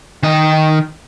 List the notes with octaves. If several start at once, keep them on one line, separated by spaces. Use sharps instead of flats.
D#3 D#5